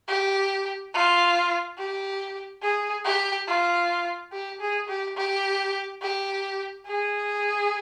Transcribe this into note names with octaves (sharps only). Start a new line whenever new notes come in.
G4
F4
G4
G#4
G4
F4
G4
G#4
G4
G4
G4
G#4